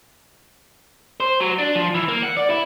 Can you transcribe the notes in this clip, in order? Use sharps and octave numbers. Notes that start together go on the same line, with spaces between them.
C5
F#3
D4
F3
E3
A#3
F#5
D5
E4